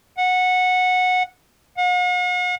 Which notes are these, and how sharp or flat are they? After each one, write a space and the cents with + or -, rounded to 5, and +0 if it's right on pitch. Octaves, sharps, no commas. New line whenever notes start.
F#5 -15
F#5 -45